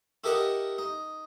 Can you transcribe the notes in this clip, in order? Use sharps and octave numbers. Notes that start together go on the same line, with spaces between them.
E4 G4 A4 A#4 D#5 F#5
D#4